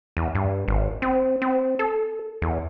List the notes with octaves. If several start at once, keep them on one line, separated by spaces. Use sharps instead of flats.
E2
G2
G#1
C4
C4
A4
E2